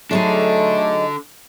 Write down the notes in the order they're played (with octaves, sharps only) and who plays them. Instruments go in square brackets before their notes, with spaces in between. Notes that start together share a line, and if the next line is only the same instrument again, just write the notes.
[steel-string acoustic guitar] F#3 D#4 G#4 [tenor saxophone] A3 [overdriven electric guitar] D4 A4